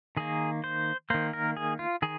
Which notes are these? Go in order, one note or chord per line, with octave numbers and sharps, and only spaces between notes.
D#3 A#3 G#4
C5
D#3 A#3 C5
A#4
G#4
F4
D#3 G#4